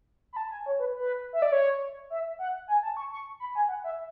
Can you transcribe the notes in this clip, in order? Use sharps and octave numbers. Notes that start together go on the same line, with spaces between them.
B5
A5
G#5
C#5
B4
B4
E5
D5
C#5
E5
F#5
G#5
A5
C#6
C#6
B5
G#5
F#5
E5